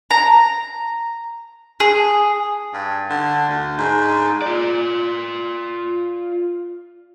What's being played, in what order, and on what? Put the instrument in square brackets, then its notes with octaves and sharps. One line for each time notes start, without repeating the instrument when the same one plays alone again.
[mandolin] A#5
G#4
[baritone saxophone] G2
D3
D2
G#2
[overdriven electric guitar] F4 D5